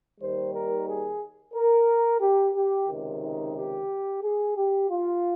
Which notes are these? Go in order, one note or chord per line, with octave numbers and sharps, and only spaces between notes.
D#2 D#3 G3 C5
A#4
G#4
A#4
G4
G4
C#2 C3 D#3
D#4
G4
G#4
G4
F4